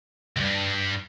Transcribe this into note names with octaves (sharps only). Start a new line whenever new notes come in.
C#2 G2